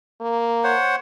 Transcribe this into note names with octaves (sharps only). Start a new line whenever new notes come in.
A#3
C5 C#5 F#5